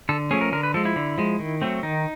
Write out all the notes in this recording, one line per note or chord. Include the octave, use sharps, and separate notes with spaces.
D3 A4
F3 A3 C#4 G#4
A#4
D3 A#4
B4
F3 G#3 A4
E4
D3
F3 G#3
D#3
F#3 A3 C4
D#3 D#4